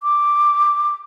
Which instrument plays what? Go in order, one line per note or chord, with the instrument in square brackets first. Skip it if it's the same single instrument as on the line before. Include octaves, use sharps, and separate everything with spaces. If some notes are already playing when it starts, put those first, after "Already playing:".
[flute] D6